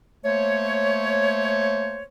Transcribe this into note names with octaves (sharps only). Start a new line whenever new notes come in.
A3 A#3 C5 C#5